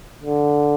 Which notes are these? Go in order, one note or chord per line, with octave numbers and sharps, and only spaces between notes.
D3